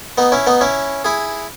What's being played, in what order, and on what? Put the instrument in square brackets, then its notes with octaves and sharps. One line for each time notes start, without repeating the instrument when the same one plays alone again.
[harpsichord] B3 D#4
C#4 E4
B3 D#4
C#4 E4
E4 G#4